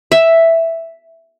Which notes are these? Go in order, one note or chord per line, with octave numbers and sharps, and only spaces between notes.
E5